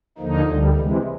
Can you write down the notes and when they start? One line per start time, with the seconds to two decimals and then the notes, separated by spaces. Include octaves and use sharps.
0.18 D#2 D3 F3 A#3 D#4
0.46 D2 D3 G3
0.74 C3 E3 G#3